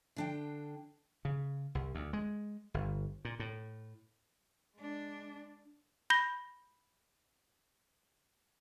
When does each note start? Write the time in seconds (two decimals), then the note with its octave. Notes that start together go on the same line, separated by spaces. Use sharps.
0.16 D3 D4 G5
1.25 C#3
1.75 C2
1.95 D2
2.13 G#3
2.74 G1
3.25 A#2
3.40 A2
4.75 G#3 D4
6.10 B5 G6 A#6 G7